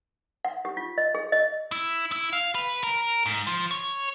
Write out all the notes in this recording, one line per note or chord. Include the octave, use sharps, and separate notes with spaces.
F#5
G4
F4
D#5
G#4
D#5
E4
E4
F5
B4
A#4
G#2
F3
C#5